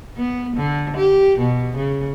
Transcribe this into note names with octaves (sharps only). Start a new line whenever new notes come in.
B3
D3
G4
B2
C#3